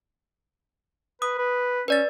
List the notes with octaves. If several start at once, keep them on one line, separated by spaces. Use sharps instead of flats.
B4 D#6
B4
C#4 B4 D5 A6